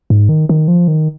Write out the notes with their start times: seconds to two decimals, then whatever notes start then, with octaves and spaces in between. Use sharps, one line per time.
0.10 G#2
0.29 D#3
0.49 D#3
0.68 F3
0.88 D#3